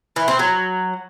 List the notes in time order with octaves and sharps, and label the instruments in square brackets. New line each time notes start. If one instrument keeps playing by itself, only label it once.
[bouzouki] E3
C4
F#3